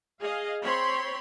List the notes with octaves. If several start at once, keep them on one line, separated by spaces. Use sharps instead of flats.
G#4 D#5 F5
C4 C#5 B5 C6